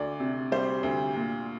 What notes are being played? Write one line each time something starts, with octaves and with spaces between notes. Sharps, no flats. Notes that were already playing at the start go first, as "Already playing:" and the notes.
Already playing: D2 D5
C3
G3 C5
D2
A#2